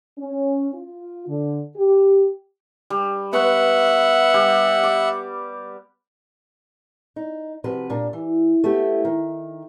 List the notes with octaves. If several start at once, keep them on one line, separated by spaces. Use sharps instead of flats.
C#4
F4
D3
G4
G3
B3 B4 E5 F#5 C#6
G3
D6
D#4
C3 F3 F#4 B4
A#2 D4 F5
E3
A3 B3 E4 G4
D#3